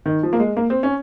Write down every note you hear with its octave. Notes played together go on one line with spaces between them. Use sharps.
D#3
F3
A#3
G#3
A#3
C4
C#4